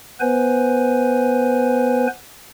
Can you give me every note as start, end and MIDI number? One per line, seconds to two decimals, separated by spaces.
0.20 2.07 59
0.20 2.07 71
0.20 2.07 72
0.20 2.07 80